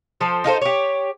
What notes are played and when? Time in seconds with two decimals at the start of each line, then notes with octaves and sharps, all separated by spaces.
0.20 F3 A4 C5
0.44 D#4 F4 A4 C5
0.61 G4 C#5